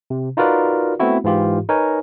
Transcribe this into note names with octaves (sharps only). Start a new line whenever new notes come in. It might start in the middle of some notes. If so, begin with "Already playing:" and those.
C3
D#4 F4 F#4 A#4 B4 D5
A3 B3 C4 E4 F#4
G#2 E3 F4 G4
D#4 A#4 B4 C#5 G#5